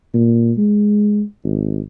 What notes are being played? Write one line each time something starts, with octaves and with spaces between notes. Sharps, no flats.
A#2
G#3
G#1